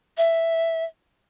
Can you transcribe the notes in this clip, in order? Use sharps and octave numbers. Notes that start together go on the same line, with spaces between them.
E5